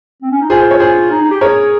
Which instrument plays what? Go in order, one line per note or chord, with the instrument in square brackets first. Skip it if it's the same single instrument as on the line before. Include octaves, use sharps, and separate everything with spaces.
[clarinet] C4
C#4
D#4
[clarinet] F4 [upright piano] G#4 C5
[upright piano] G#4 C5
C#5
G#4 C5
[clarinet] D#4
D#4
G4
[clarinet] G#4 [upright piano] A#4 C#5